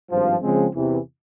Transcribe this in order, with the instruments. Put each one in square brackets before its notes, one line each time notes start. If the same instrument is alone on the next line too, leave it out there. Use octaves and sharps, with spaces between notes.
[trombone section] G#1 G2 F3
C#3 F3 G#3 C4
E2 C3 E3